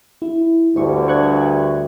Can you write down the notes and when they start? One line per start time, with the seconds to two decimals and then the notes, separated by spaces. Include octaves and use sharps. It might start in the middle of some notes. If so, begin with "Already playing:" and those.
0.22 E4
0.76 D2 G2 C5 C#6
1.08 C#6 F#6 G#6